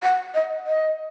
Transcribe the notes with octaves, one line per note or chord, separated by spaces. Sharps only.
F#5
D#5
D#5